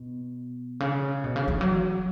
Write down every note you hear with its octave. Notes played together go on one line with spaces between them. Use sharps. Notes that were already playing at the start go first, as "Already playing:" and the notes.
Already playing: B2
C#3
B2
C#3
E3
F#3